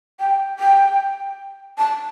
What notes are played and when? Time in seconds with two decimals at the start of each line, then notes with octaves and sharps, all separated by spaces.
0.20 G5
0.59 G5
1.78 A5